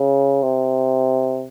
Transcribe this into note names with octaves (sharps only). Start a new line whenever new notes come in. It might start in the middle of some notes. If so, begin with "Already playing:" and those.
Already playing: C#3
C3